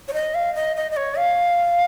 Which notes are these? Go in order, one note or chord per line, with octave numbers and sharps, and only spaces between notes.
C#5
D#5
F5
D#5
D#5
D#5
C#5
F5